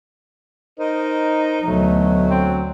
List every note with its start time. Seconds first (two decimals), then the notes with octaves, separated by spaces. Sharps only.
0.79 D#4 A#4 C5 D#5
1.64 D2 B2 F#3 A3
2.30 C4